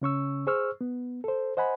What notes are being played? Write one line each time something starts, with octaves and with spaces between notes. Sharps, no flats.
C#3 C#4 C#6 E6
G#4 C5 C#6 E6 F6
B3
A4 C5
C5 D#5 F#5 G#5 B5